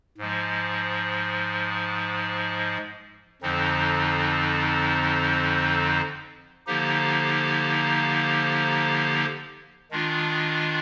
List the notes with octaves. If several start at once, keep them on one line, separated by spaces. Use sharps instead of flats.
G#2 F3 G#3
F2 D3 F3 C4 D#4
D3 F3 A#3 D#4 G4
D#3 G#3 D4 F4